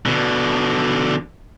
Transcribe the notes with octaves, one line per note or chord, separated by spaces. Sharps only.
B2 D3